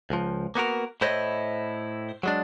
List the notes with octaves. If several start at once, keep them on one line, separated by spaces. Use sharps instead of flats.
C#2 F3
A#3 B3 F#4 A#4
A2 E4 C5 C#5 D#5
F#3 G#3 D4